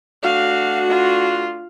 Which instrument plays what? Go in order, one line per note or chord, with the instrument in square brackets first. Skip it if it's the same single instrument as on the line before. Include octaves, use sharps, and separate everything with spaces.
[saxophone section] A3 D4 F#4 [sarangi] F5
[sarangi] F4